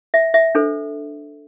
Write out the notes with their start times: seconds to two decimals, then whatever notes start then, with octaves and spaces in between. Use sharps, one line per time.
0.14 E5
0.34 E5
0.55 D4 A4 C5